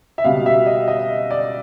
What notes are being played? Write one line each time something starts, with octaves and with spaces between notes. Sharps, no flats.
E5
C#2 B2 G3 F5
E5
D#5
D#5
D5